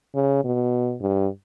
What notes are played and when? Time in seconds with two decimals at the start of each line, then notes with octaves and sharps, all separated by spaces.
0.15 C#3
0.44 B2
1.01 G2